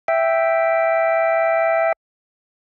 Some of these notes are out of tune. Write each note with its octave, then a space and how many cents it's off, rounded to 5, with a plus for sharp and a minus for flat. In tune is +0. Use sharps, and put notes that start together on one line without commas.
E5 +0 G5 +0